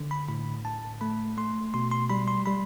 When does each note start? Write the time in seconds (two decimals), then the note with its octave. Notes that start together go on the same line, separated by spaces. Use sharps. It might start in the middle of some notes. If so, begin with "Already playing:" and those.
Already playing: D3
0.11 B5
0.28 A2 B5
0.65 A2 A5
1.01 A3 B5
1.37 A3 C6
1.74 B2 C6
1.91 C6
2.09 G3 B5
2.28 C6
2.46 G3 B5